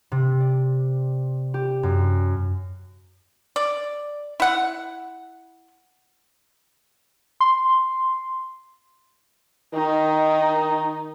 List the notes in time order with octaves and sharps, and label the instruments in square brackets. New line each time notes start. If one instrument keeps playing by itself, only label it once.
[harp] C3
D5
G4
F#2
[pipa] D5
E4 F#5
[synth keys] C6
[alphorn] D#3 [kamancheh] D#4